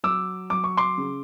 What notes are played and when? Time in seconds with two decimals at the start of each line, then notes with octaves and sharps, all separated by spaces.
0.04 F#3 D6 E6
0.50 F#3 D6
0.64 C#6
0.77 C6 D6
0.98 C#3